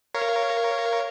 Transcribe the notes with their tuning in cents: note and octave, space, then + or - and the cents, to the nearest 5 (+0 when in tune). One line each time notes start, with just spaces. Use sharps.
A#4 +0 C#5 +0 F5 -20